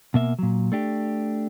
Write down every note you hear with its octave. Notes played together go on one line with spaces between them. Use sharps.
B2 A#3 E5
A#2 F#3
A3 D4 G4